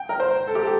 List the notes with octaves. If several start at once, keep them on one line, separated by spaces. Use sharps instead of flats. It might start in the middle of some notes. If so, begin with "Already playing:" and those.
Already playing: G5
A#4
C5
A4
G4
A4